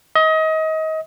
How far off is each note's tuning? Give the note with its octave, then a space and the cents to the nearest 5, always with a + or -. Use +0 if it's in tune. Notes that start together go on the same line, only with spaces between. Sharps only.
D#5 +30